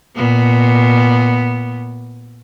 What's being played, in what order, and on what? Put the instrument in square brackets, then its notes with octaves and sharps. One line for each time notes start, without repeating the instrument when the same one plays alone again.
[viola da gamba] A#2 B3